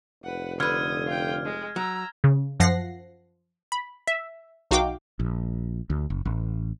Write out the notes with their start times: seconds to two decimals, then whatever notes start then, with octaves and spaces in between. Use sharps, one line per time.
0.23 F1 B4 F#5
0.60 D3 B4 D#6 F6 G#6
1.07 F4 G5
1.45 G#3
1.76 F#3 A#5 E6
2.24 C#3
2.60 F#2 F3 F#5 A#6 C7
3.72 B5
4.07 E5
4.71 B1 D#4 F#4 F5 G5 D6
5.20 A#1
5.90 D2
6.10 F#1
6.25 A1